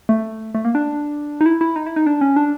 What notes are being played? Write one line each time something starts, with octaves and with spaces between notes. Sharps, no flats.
A3
A3
A#3
D4
D#4
E4
E4
D#4
E4
D#4
D4
C#4
D4